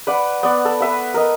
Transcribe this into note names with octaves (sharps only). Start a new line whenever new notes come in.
B4 D5 F#5
B3 D5
A4
B4 E5 F#5
A#4 D#5